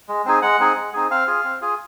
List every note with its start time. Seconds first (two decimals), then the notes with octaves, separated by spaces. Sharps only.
0.08 G#3
0.26 C4 D#4 G#4
0.42 G#3 F#5
0.60 C4 D#4 G#4
0.76 G#3
0.94 C4 D#4 G#4
1.10 C4 F5
1.27 F4 G#4
1.44 C4
1.61 F4 G#4